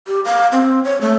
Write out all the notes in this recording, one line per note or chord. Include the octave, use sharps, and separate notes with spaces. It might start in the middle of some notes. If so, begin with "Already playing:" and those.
G4
F5
C4
C#5
A3